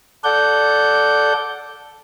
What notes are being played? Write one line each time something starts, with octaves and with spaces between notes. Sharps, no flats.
A4 D5 F#5 G6